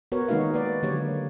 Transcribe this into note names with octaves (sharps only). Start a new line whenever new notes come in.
B3 F#4 A#4 B4 C#5
D#3 G#3 A#3 D#4 F#4 F5
B4 D5
D3 F#3 A#3 G4 C#5